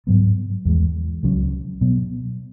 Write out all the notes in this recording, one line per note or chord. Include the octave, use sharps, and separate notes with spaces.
G#2 F#3 B3
E2 E3 G#3
C#2 C#3 F#3 C#4
B2 F#3 B3